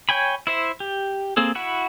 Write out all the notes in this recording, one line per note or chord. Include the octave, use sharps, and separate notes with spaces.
C#5 G5 G#5 B5
E4 C5 E5
G4
A#3 C4 G#4 A4
E4 F#4 F#5 B5